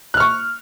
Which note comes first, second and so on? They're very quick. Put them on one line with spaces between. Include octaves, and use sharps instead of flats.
F#6 F6 C#6